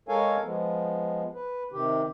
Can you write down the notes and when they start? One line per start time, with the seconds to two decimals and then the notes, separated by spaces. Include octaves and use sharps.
0.09 G#3 A4 A#4 C#5 F5 G#5
0.44 F3 G#3 B3
1.34 B4
1.72 C3 D#3 G4